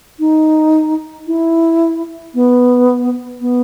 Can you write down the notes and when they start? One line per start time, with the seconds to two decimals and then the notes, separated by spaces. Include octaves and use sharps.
0.20 D#4
1.27 E4
2.34 B3
3.41 B3